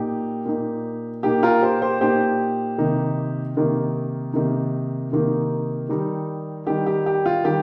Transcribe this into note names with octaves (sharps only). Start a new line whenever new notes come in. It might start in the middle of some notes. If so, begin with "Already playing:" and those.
Already playing: A#2 A#3 D#4 G4
A#2 A#3 D#4
A#2 A#3 D#4 G4
F4 A#4
G4 C5
G4 C5
A#2 A#3 D#4 G4 C5
C3 D#3 A#3 D#4
C3 D#3 A#3 D#4
C3 D#3 A#3 D#4
C3 D#3 A#3 D#4
D#3 G3 D#4
D#3 G3 D#4 G4
G4
G4
F4
D#3 G3 D#4 G4